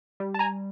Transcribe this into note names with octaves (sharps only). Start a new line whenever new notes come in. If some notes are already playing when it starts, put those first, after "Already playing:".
G3
A5
G#5 A#5